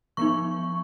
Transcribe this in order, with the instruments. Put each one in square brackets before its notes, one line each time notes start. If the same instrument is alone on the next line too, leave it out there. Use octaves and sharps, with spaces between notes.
[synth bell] F3 B3 D#4 C#6